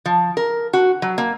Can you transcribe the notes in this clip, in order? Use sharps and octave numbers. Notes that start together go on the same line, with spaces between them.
F3
A#4
F#4
F#3
A#3